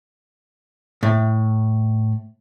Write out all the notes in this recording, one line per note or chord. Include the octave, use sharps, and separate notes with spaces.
A2